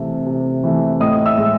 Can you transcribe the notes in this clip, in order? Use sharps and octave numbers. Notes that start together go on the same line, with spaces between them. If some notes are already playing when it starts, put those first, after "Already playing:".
Already playing: C3 E3 A3
C3
E3 A3
A2 D#5 D#6
E5 E6
G#3